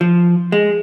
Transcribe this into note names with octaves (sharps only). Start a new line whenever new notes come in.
F3
G#3